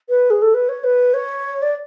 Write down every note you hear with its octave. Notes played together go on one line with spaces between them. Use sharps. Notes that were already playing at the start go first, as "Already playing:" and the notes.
B4
G#4
A4
B4
C#5
B4
C#5
D5